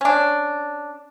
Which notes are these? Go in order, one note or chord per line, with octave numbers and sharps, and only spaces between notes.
C#4 D4